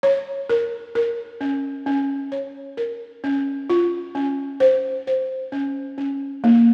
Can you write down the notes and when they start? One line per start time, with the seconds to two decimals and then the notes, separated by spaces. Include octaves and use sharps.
0.03 C#5
0.50 A#4
0.95 A#4
1.41 C#4
1.86 C#4
2.32 C#5
2.77 A#4
3.24 C#4
3.70 F4
4.15 C#4
4.60 C5
5.07 C5
5.52 C#4
5.98 C#4
6.44 A#3